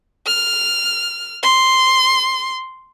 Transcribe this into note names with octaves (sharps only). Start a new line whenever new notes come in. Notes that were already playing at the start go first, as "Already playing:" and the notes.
F6
C6